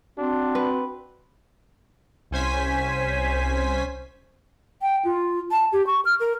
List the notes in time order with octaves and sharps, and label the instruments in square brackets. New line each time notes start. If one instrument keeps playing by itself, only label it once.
[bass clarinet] C4 [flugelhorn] D4 [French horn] F#4
[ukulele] B4
[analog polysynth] C2 C#4 C5 G#5 B6
[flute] G5
F4
A5
G4
C#6
F6
A#4